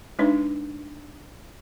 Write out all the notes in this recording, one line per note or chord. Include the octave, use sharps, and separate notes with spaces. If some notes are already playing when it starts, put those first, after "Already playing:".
G#3 D4 D#4 B4